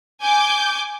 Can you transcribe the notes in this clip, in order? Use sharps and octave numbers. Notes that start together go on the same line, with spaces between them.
G#5 D6 G6